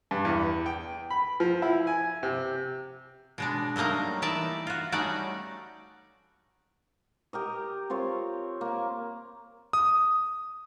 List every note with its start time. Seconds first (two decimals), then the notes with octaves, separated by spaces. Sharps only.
0.11 G2
0.25 E2
0.66 G5
1.10 B5
1.40 F3
1.62 E4
1.87 G#5
2.23 C3
3.38 B2 G#3 D4
3.76 F#3 G3 A3 A#3 D#4
4.22 E3 D#4 D5 E5 A5
4.67 F4 F#4
4.92 G3 A3 C#4 D#4 F#4 D5
7.33 G4 A#4 D#5
7.90 C4 F4 A#4 C#5
8.61 A#3
9.73 D#6